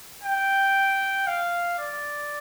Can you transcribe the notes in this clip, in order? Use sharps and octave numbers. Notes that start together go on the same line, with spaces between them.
G5
F5
D5